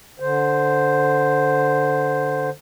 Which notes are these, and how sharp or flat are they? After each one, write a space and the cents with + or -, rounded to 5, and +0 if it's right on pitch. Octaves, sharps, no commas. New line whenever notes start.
D3 +0 C5 +0